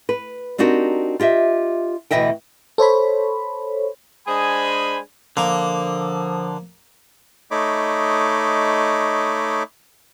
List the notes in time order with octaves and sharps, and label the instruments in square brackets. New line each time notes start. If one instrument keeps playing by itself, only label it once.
[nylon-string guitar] B4
C4 D4 D#4 F#4 G4 A#4
F4 G4 D#5 E5
D2 B2 E3 D#5 E5 G5
[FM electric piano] A4 C5 C#5 B5
[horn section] G#3 D4 G#4 C5 G#5 B5
[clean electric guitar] D3 [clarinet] F3 [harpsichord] A#3
[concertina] A3 D#4 C#5 D#5 B5 D6